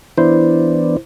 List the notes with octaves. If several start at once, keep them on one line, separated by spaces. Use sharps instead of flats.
E3 B3 D4 E4 C5